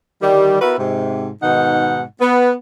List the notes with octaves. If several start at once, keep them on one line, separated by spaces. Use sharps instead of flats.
D3 D#3 G3
B3 E4 F#4 A#4 B4
G#2 C3
G#2 B2 D#3 D#4 F#5
B3